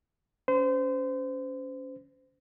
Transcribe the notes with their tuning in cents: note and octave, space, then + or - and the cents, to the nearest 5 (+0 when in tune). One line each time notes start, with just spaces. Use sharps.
C#4 +20 C5 -30